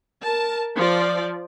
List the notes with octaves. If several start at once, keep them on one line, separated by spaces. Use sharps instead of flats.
A#4 A5
F3 D5